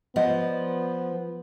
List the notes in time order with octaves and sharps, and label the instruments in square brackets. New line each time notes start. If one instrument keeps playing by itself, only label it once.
[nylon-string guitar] F3 [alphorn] B3 [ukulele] D5 D#5 F#5